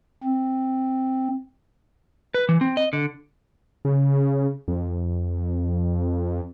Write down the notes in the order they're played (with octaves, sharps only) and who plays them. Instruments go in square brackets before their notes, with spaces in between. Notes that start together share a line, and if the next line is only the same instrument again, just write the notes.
[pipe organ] C4
[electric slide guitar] B4
E3
C4
D#5
D3
[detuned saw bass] C#3
F2